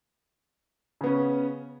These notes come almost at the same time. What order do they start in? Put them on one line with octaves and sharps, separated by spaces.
C#3 B3 C#4